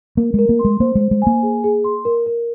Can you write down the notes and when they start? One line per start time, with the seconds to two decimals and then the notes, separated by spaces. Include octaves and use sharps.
0.17 A#3 A#4
0.34 G#3 A#4
0.49 A#3
0.59 C6
0.65 G#3
0.80 A#3 C5
0.95 G#3
1.01 C5
1.11 G#3
1.22 A#3 G#5
1.43 G#4
1.64 G#4
1.84 C6
2.05 A#4
2.26 A#4